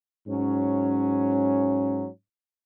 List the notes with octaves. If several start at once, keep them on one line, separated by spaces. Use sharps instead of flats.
G#2 F#3 C#4